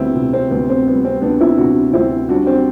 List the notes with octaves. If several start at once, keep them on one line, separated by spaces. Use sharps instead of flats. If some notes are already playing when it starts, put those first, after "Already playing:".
Already playing: D2 G3 B3 C4 E4
C3
C4
D2 B3
C4
G3 B3
C4
D2 B3 D4
C4 E4
C3 D4 F#4
D2 C4 E4
G3 D4 F#4
C4